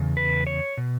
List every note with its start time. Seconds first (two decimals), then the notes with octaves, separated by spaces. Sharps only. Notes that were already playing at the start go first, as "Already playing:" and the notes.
Already playing: E2 C#3
0.17 B4
0.47 C#5
0.77 B2